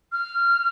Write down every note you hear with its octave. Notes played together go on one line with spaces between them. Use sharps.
F6